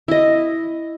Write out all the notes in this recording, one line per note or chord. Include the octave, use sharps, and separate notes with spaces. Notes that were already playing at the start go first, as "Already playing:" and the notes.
E4 D#5